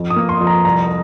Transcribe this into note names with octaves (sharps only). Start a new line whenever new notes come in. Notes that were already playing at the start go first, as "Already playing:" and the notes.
Already playing: F2
D#6
A#3
C6
F2
A#5
C2 A#5